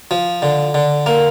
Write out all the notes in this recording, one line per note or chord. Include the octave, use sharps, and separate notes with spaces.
F3
D3
D3
A#3